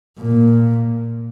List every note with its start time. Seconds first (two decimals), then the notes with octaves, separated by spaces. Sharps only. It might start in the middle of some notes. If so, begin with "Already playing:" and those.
0.18 A#2